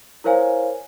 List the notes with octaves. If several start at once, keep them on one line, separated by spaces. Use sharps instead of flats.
E4 A#4 C5 C#5 F5 G#5